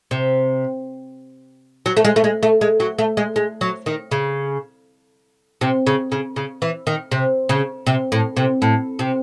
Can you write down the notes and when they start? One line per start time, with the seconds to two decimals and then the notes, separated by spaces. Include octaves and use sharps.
0.11 C3
1.86 F#3
1.97 A3
2.05 G#3
2.16 A3
2.24 G#3
2.43 A3
2.61 G#3
2.80 F#3
2.98 A3
3.17 G#3
3.36 G#3
3.61 F#3
3.86 D#3
4.11 C#3
5.61 C3
5.87 C#3
6.12 C#3
6.36 C#3
6.62 E3
6.87 D#3
7.11 C3
7.49 C#3
7.87 C3
8.12 A2
8.37 C3
8.62 A2
8.99 C3